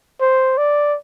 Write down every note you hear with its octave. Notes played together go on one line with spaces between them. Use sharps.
C5
D5